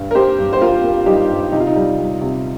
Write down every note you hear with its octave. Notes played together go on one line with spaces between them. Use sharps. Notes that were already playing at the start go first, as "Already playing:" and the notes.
Already playing: G2 G3
A#4
A#3 G4 C5
G2
C5
A#3 F4 A#4
A#3
G3 D#4 G4
G2
C3 D#4
F4
D#4
G3
G3
C3